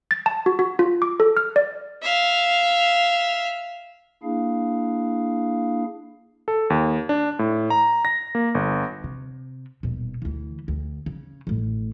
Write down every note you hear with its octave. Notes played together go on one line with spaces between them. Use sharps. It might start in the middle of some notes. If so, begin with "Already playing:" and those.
A6
A5
F#4
F#4
F4
D6
A4
F6
D5
E5 F5
A#3 D4 E4 G#4 F5
A4
D#2
D4
A2
A#5
A#6
A#3
G1
C3
D#1 B2
D2 E3
D2
C#3
A1 A2